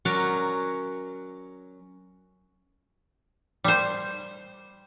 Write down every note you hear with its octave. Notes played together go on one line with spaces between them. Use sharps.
F#3 C#4 F#4 A#4 C#5 D5
G3 C5